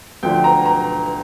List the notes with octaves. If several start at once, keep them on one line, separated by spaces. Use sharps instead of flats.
D2 D3 F3 D4 G5
A#5
A#5